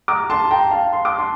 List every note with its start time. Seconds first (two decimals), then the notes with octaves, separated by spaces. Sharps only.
0.08 A#5 D6
0.30 A5 C6
0.51 G5 A#5
0.71 F5 A5
0.93 C6
1.05 D6
1.18 A5 C6